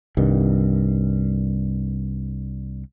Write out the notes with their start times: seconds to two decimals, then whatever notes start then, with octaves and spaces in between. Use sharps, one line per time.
0.17 C2 G2 D#3